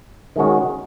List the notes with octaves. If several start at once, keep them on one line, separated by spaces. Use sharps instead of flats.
D#3 G#3 C#4 F#4